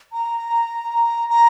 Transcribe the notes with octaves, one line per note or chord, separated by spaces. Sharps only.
A#5
A#5